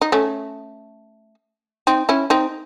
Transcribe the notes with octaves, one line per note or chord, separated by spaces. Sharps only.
D#4
A3 C#4
C4 D#4
C#4 E4
C4 D#4